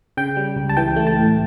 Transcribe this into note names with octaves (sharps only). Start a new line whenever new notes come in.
C#3 G5
G3
C#2
A5
E3 G5
A3
A5
A2